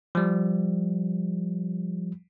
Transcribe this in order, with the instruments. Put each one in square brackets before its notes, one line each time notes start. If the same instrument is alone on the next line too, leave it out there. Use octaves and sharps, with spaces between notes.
[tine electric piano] F3 G3